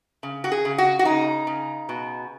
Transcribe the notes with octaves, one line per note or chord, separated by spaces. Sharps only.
C#3
F#4
G#4
C#3
F#4
F#4
C#3 D#4
C#3
B2